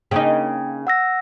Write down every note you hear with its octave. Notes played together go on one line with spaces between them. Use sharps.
C#3 A#3 D#4 G5
F#5 E6 A#6